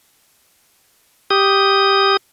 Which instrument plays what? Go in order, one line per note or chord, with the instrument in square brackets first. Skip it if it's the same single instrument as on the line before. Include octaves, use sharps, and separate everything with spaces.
[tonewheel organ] G4 D#6